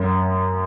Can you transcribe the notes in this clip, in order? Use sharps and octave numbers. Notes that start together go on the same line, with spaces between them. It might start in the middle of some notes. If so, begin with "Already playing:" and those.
Already playing: F#2